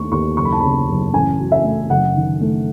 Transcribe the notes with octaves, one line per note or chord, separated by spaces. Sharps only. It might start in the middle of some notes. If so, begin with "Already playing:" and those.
Already playing: D#2 A3 C#6
D#2 C#6
F#1 C#6
B5
A5
C#3 B5
F#1
A1 G#5
F#3
E5
A3
F#1 F#5
D#3
A3